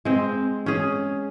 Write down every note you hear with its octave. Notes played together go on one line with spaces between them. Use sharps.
G#3 C4
C#4 G#4